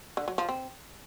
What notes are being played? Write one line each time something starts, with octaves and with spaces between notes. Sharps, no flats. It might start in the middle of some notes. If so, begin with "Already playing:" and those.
D3
F#3
F3
C4